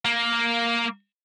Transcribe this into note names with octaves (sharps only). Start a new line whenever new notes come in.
A#3